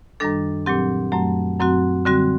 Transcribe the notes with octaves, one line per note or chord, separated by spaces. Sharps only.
F#2 D#3 G3 D4 A4
A#2 F#3 C4 G4
F#2 F#3 A3
F#2 F#3 C4 F#4
D3 G3 C4 F#4